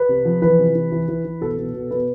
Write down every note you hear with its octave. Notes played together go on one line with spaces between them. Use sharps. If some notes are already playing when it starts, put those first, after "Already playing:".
Already playing: B4
C3
F3
E3 B4
C3
E3
E3
E3
E3
B2 A4
B2
B2
B2 B4